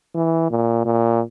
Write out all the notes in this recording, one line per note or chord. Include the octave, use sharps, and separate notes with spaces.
E3
A#2
A#2